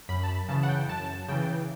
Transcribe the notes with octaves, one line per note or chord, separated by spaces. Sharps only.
F#2 B5
A5
B5
C#3 E3 A5
F#5
G5
F#2 A5
C#3 E3 G5